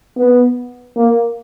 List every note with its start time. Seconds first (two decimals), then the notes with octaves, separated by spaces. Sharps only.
0.17 B3
0.96 A#3